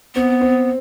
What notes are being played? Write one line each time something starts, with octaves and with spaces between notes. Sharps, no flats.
B3 C4
C4